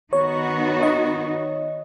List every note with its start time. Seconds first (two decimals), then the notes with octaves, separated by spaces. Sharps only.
0.12 D#3 B3 D#4 F#4 C#5
0.83 D#5